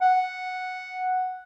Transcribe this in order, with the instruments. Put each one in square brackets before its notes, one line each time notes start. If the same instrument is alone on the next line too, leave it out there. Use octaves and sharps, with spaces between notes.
[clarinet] F#5